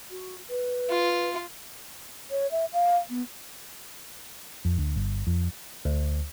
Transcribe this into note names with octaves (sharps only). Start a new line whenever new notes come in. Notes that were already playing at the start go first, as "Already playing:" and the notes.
F#4
B4
F4
C#5
E5
F5
B3
F2
D2
G1
F2
D2